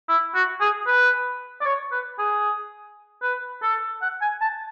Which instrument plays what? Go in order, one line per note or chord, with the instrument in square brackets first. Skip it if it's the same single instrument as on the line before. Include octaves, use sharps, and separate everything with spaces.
[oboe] E4
F#4
G#4
B4
D5
C#5
B4
G#4
B4
A4
F#5
G#5
A5